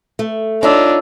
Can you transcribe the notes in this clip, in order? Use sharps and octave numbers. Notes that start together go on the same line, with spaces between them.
A3
D4 D#4 F4 C#5 E6